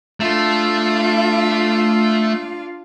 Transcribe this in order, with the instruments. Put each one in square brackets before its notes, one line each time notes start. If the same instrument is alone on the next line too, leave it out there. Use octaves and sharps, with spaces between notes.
[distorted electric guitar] A3 [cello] D4 F4